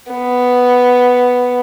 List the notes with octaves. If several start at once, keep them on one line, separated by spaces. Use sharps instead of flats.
B3